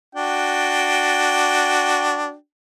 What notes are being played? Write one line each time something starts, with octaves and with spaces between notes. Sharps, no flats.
D4 F#4 G5